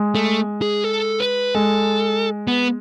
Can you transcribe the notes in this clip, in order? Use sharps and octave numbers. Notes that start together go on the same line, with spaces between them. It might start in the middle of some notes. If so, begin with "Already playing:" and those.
Already playing: G#3
A3
G#4
A4
B4
G#3 A4
B3